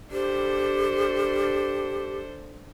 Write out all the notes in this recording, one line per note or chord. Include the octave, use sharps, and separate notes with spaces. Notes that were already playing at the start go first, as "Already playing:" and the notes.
D4 G4 A4 C5